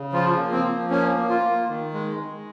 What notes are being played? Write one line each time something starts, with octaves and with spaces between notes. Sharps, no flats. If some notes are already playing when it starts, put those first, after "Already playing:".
Already playing: C#3
F3 F4
A#3
C4
F3
A#3 C#4
A#3
F4
A#3
D#3
G#3
G#3